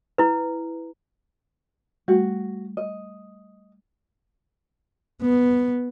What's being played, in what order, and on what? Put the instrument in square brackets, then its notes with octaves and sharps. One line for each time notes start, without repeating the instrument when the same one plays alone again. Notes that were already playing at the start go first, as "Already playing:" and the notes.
[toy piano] E4 B4
[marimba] G3 A3 [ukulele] F#4
[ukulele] D#5
[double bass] B3